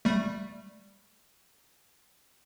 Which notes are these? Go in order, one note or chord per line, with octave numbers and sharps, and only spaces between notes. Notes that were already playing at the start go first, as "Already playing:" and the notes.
G3 A3